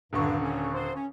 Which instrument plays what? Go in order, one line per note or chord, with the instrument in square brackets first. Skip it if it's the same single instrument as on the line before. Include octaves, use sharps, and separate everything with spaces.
[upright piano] D#1 D3 C#6 [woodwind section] G2
[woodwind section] C#4
C5
C#4